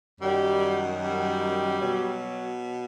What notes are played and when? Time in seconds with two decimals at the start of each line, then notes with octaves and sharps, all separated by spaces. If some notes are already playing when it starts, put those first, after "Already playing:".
0.21 F#2 D#3 F#3 G3
1.00 G3
1.79 B2 F#3